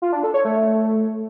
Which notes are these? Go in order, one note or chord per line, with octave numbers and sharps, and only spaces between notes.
F4
D4
A4
C#5
A3